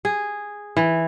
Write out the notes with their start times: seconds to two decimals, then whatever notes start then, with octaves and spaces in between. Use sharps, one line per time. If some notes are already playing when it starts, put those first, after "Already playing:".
0.05 G#4
0.77 E3